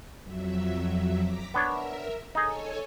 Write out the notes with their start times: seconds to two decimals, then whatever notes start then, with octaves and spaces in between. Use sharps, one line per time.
0.24 F2 F#3 E5
1.21 A#5 D6 B6
1.54 B3 D4 A#4 C#5 E5
2.35 D#4 G#4 A4 C#5 G#5